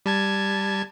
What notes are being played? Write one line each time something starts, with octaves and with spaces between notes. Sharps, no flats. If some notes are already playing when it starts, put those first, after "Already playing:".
G3 A5 G#6